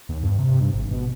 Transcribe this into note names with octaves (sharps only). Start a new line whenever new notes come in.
D#2
G2
C3
G2
G#1
B2